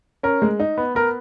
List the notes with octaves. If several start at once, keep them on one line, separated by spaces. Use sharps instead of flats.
C#4 A#4
G#3
D#4
B3
B3 A#4